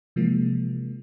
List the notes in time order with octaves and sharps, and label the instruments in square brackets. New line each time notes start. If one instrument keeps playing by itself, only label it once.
[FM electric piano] C3 E3 F3 G#3 A#3